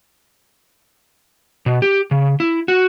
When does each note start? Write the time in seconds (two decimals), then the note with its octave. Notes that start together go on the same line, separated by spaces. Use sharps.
1.66 B2
1.82 G4
2.11 C#3
2.40 E4
2.68 F#4